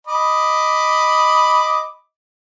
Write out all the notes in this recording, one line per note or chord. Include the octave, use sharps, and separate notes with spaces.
D#5 B5 D6